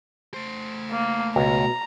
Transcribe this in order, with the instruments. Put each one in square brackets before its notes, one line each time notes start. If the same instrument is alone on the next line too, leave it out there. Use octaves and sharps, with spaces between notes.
[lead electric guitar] A3 C5
[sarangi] A#3
[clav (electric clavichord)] C#2 [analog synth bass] B2 [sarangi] A#5